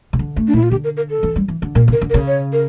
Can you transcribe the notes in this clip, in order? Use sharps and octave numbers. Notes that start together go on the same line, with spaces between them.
C#3
D3
A3
D4
A#2 E4
F4
D3 G4
A#4
A#4
A4
E3
G3
E3
D3
A#2 A#4
C#3 A#4
D3
A#4
C#3
C#5
A#4